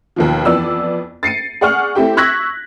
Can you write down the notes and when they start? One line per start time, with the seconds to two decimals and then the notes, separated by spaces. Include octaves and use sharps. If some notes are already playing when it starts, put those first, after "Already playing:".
0.16 D#2 B2 F3
0.45 F2 E3 B3 D5 E6
1.23 A6 C7 C#7 D#7
1.61 G#4 D5 F#5 C#6 F6
1.95 A3 C4 E4 G4 G5
2.17 C#6 E6 F#6 G#6 A#6 B6